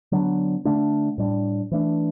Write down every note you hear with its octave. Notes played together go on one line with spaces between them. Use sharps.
D3 F#3 B3 D4
D3 A3 D4
A2 G3 D4
E3 A3 D4